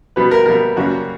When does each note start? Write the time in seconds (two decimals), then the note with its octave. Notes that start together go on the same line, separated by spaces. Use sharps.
0.16 B2 G3 B3 B4
0.31 A#4
0.46 B2 G3 B3 A#4
0.76 F#2 C#3 G3 A#3 F#4